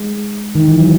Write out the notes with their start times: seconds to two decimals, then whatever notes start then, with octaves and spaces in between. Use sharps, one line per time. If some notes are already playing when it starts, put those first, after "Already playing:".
Already playing: G#3
0.55 D#3
0.68 E3
0.80 F#3